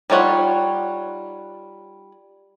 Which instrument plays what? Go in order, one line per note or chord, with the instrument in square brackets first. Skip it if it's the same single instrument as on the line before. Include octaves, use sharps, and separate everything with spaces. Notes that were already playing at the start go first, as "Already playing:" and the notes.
[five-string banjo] G3 D#4 F4 C#5 F#5